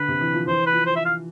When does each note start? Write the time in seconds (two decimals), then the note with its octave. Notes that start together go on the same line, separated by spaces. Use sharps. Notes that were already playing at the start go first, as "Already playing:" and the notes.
Already playing: D3 B4
0.08 C3
0.21 E3
0.34 F3
0.47 E3 C5
0.66 B4
0.73 F3
0.86 C5
0.96 E5
1.05 F5